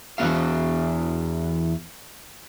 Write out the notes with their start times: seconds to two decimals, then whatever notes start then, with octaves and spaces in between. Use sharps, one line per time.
0.18 E2 G#2 B3 F#4 F5